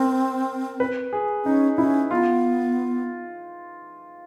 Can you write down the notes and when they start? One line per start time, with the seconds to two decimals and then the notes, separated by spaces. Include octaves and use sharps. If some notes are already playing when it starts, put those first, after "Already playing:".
Already playing: C4 A#4
0.80 B4
1.13 G#4
1.45 C#4 D#4
1.78 C#4 E4
2.11 B3 F4